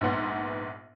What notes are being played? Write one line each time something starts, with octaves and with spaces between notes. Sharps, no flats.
A#1 G#2 B3 C6